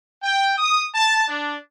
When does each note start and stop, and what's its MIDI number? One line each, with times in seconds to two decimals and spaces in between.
0.23 0.56 79
0.58 0.83 87
0.95 1.27 81
1.28 1.53 62